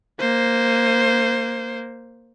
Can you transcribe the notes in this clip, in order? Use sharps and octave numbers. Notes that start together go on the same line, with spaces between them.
A#3 C5